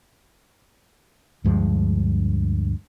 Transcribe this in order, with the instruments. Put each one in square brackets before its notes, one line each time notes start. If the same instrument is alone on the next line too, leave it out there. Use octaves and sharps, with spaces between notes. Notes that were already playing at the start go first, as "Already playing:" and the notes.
[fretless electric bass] D2 G2 F3 G#3